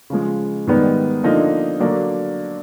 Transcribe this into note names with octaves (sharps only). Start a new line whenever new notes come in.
C#3 F3 G#3
G#2 D#3 G3 B3
D3 F3 A#3 D#4
D3 F#3 A#3 D4